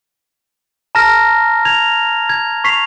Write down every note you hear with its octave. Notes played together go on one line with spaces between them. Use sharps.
A5 A#5 F6 A#6
G#6 F7
G#6
C#6 B6 C7 F7